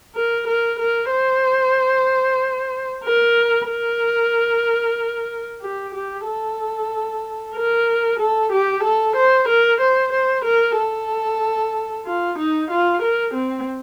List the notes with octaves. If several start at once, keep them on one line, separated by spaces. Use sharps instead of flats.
A#4
A#4
A#4
C5
A#4
A#4
G4
G4
A4
A#4
A4
G4
A4
C5
A#4
C5
C5
A#4
A4
F4
D#4
F4
A#4
C4